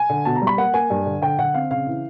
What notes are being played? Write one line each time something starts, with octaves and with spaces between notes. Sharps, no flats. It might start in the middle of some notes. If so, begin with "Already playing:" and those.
Already playing: G#5
D3
B2 A5
A#5
G3
B5
A#3 F#5
A#3 G#5
G2
D3
D3 G5
D3 F#5
C4 F5
C#3 F5
E3